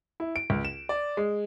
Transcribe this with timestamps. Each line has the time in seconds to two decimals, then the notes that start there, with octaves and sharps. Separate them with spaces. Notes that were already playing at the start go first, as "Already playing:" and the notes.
0.20 E4
0.36 D7
0.50 C#2
0.65 E7
0.89 D5
1.17 G#3